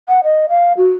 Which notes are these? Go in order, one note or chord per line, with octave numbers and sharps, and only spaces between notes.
F#5
D#5
F5
F#4